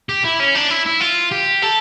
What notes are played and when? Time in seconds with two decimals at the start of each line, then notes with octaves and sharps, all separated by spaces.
0.09 G4
0.24 E4
0.40 C#4
0.55 D4
0.70 E4
0.86 E4
1.01 F4
1.32 G4
1.62 A4